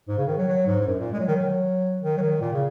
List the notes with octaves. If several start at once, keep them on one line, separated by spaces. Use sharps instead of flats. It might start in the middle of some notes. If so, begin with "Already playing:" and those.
G#2
C#3
D#3
F#3
F#3
G#2
G#2
F#2
A#2
G#3
F#3
D#3
F#3
D#3
F#3
D#3
A#2
C#3